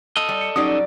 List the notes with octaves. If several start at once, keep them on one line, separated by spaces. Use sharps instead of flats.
A4 D#5
G3
C#7
F#3 G3 C#4 D#4 D5 D#6